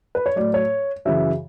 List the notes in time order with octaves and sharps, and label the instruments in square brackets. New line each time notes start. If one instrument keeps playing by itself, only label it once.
[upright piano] B4
C#5
A2 F#3 D5
C#5
F#2 C#3 E3 E5